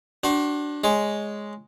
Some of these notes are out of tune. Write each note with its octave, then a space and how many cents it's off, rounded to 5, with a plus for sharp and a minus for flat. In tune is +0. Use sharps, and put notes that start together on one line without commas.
D4 +0 F#4 +35 C5 +35
G#3 +0 C#5 +0